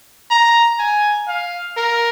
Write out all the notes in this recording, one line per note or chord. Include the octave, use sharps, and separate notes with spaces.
A#5
G#5
F5
A#4